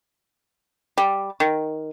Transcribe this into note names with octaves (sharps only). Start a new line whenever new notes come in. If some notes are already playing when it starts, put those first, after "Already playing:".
G3
D#3